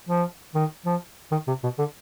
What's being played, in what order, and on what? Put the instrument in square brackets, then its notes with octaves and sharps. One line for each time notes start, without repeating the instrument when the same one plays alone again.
[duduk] F3
D#3
F3
D#3
C3
B2
D3